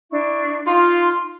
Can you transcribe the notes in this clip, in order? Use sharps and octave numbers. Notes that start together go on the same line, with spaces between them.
D4 E4 C#6
D#4 F4 C6